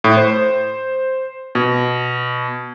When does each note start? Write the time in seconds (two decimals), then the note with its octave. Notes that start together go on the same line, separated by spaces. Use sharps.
0.04 A2
0.17 C5
1.55 B2